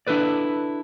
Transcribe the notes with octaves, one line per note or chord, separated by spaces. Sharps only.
D4 E4 A4 B4 D5